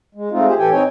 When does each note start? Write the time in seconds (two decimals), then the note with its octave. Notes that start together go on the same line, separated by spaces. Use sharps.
0.15 G#3
0.31 G#3 A3 C4 D#4 F4
0.47 G4 G#4 C5
0.58 A2 E3 G4 A4 G5 G#5
0.71 C4 D#4 C#5 G5 G#5